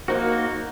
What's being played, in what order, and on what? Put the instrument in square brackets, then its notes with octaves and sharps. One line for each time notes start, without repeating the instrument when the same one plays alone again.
[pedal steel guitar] A#3 D#4 F#4 [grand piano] A#4 C5